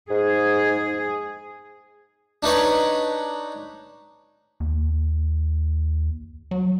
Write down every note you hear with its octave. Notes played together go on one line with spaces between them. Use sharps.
G#2 G#4
D4 D#4 B4 C#5
D#2
F#3